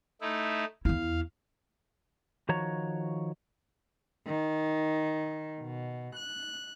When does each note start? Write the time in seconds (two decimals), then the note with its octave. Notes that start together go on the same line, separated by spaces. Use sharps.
0.21 A3 D#4 E4
0.85 E2 E4 F5
2.49 D#3 F3 F#4 C#5 A#5
4.25 D#3
5.60 B2
6.15 F#6